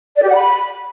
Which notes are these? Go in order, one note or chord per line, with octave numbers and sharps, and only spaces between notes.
D5
G4
F#5
B5